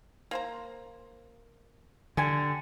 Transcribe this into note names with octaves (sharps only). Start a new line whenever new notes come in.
A#3 C5 A#5
D3 G3 G#5